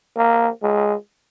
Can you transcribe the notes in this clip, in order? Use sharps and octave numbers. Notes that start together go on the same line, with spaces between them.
A#3
G#3